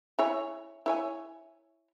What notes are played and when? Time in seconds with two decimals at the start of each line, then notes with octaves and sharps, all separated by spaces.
0.19 E4 C#5 G#5
0.86 E4 C#5 G#5